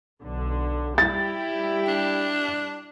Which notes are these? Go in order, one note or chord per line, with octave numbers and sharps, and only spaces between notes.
B1 D3
G3 E4 G4 A6
D4